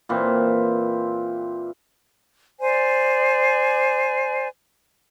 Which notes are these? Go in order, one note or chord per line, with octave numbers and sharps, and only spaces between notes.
A#2 E3 C4
C5 D5 G#5